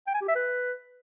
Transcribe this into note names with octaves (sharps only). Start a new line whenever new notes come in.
G5
G#5
G4
E5
B4